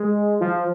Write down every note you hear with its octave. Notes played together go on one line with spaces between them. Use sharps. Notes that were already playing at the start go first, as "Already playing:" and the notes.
Already playing: G#3
F3